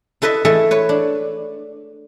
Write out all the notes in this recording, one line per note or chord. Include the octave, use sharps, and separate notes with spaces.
E4 A4 B4 D#5 E5
E3 A3 E4 G#4 A4 E5
B4 C#5
D4